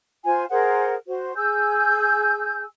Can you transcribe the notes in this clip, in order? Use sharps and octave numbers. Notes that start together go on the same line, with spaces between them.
F4 C5 G#5
G#4 A#4 C5 F#5
F#4 C5
G#4 G#5 E6 G6